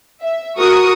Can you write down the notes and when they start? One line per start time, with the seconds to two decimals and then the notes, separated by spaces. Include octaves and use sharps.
0.22 E5
0.58 F#4 A#4 C#6 D#6